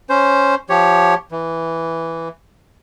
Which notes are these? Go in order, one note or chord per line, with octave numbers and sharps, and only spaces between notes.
C#4 C5
F3 G4 C#5
E3